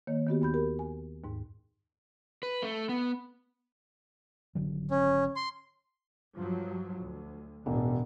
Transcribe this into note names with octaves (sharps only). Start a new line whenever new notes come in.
D#3 A#3 C#5
D#3 B3 F#4 G4
D#2 B5 G6
G4 A#4
G#5
D#2 G#2
B4
A3
B3
G#1 D3 F#3
C#4
C6
G2 F3 F#3
D2
E1 A1 D3